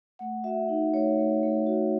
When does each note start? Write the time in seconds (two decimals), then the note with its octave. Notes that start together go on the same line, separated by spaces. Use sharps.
0.19 A3 F#5
0.44 F#4 E5
0.69 D#4
0.93 A3 C#5
1.18 A3
1.43 A3
1.67 F#4